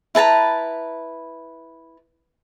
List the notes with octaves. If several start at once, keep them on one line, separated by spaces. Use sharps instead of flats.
E4 B4 A5 A#5